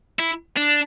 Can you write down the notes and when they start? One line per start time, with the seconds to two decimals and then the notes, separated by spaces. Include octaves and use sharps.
0.19 E4
0.57 D4